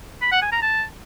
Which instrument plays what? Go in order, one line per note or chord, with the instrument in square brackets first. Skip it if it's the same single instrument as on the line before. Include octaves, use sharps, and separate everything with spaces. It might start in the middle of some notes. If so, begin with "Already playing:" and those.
[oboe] B5
F#5
G#5
A#5
A5